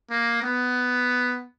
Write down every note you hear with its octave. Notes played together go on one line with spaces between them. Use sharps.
A#3
B3